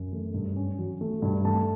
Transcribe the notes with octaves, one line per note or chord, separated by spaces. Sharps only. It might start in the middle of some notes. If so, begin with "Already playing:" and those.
Already playing: F#2
A3
G2
C#4
F#3
A3
G2
A3 A5